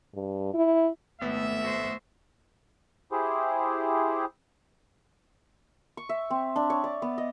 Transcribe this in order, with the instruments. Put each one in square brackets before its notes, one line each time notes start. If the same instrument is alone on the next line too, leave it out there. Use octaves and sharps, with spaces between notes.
[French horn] G2
E4
[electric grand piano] G#1 B3 [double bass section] A3 [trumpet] E5
[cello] F#4 C5
[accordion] E4 G4 G#4 C5
[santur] C#6
E5
C4
D4
C#5
D5
B3
D#5